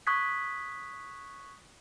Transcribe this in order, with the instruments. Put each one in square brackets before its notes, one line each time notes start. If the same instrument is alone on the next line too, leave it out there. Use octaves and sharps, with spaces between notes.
[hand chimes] C#6 D#6 F#6 G#6 B6